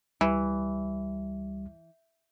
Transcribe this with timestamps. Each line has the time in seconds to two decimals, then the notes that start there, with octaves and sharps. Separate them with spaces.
0.21 C#2 E3 G3